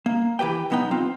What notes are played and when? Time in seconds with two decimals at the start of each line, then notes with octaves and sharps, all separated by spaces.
0.06 A#3
0.39 E3 G4 B4 G5
0.70 B1 F#3 B3 D#4 G5
0.91 C4 F4